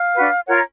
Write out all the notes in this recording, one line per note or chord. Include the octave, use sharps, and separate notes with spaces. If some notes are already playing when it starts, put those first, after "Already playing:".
Already playing: F5
D4 F#4 B4
F4 A#4 C#5 F#5
A#5